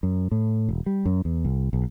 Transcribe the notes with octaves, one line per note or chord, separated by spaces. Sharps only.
F#2
A2
E1
G3
F#2
E2
C2
B1